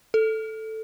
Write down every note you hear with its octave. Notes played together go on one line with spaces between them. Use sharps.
A4